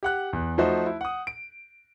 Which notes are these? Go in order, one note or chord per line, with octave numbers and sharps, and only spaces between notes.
G4 F#5 F#6
E2
F3 A3 D#4 F#4 C5
E4
F#5 D#6
D7